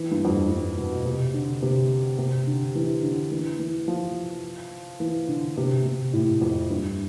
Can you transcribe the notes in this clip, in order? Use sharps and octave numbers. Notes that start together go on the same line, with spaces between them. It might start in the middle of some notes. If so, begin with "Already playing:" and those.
Already playing: E3
G2
F2
G2
G2
B2
C3
D3
C3
C3
D3
E3
D3
E3
E3
F3
E3
D3
C3
C3
A2
F2
G2